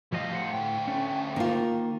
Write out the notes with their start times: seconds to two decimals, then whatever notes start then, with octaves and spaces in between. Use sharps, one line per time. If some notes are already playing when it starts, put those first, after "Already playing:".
0.12 A2 F3 G3 D#5 F5
0.31 G4 C5 F#5
0.53 D2 A2 G5
0.88 A3 C#4
1.36 D#3 A#3 F4